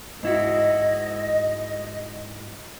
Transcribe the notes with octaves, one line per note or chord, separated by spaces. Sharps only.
G#2 E4 F#4 D#5